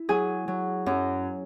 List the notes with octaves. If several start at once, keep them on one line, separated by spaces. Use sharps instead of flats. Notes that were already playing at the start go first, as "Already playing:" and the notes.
Already playing: E4
F#3 G#4 G#5
F#3
F#2